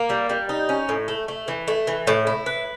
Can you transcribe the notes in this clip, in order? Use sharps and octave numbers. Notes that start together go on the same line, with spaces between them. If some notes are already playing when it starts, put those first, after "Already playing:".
Already playing: A#3
G3
G3
D#4
C#4
A2
A3
A3
E3
A3
E3
A2
E4
B4